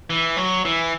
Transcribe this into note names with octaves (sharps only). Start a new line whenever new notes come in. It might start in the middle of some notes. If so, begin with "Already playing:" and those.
E3
F#3
E3